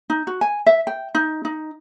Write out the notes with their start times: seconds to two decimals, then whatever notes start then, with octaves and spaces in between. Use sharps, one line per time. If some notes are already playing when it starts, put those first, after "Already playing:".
0.10 D#4
0.27 F#4
0.41 G#5
0.66 E5
0.87 G5
1.15 D#4
1.45 D#4